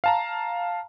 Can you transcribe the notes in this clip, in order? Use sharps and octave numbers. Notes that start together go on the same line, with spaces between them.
F5 A5 A#5